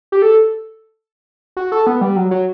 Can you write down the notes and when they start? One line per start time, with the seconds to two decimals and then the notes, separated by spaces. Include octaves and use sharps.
0.12 G4
0.22 A4
1.57 F#4
1.72 A4
1.87 B3
2.01 G3
2.16 F#3
2.31 F#3